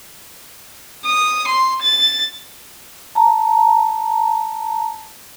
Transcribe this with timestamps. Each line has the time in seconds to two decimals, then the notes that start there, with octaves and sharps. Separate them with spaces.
1.05 D#6
1.48 C6
1.82 A6
3.15 A5 A#5